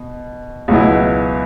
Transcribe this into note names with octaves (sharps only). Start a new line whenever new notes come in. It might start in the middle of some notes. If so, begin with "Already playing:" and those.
Already playing: B2
C#2 B2 F#3 B3 E4